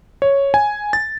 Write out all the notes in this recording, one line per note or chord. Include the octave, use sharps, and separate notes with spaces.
C#5
G#5
A6